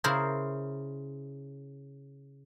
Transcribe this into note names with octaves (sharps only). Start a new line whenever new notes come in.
C#3 E4 A#4 C5